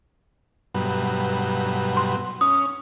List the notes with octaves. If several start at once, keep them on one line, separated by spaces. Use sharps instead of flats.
G2 B2 F#3
C6
C#4 D#6